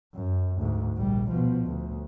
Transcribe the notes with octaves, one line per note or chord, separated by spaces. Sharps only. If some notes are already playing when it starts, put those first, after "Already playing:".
F#2
D2 G#2
A#1 G3
B2 F3
D2